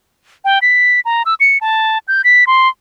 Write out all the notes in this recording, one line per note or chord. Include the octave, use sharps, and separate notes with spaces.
G5
B6
A#5
E6
C#7
A5
G6
B6
C6